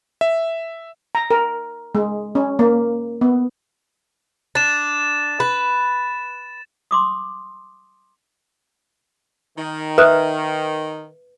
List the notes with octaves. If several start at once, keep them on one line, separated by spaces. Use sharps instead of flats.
E5
A#5
A#4
G#3
C#4
A#3
B3
D4 A6 E7
B4
C6 D6 D#6
D#3
B4 E5 D#6 F#6